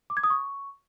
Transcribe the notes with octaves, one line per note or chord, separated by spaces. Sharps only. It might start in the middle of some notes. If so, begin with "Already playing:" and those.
D6
G#6
D#6
C#6